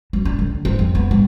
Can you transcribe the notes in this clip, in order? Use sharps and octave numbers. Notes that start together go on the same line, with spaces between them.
F#3
D4
D3
C4
F2
B3
G3